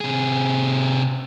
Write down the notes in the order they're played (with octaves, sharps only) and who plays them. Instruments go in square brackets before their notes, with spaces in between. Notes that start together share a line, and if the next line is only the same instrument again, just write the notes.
[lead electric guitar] C3 G#4